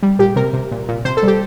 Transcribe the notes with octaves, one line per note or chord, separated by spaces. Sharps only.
G3
A#2 G4
C3 A#4
C3
A#2
A#2
C3 C5
A4
G3 G4